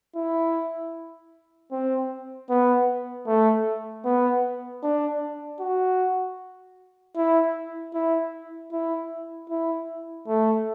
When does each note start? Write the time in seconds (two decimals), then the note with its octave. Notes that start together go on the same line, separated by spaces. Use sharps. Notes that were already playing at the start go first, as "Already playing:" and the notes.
0.16 E4
1.71 C4
2.50 B3
3.27 A3
4.05 B3
4.83 D4
5.60 F#4
7.16 E4
7.94 E4
8.72 E4
9.50 E4
10.28 A3